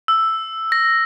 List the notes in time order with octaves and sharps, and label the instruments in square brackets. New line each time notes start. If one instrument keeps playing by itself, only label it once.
[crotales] E6
A#6